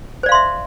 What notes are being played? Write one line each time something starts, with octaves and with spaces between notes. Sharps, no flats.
C5 D5 E5 F5 C6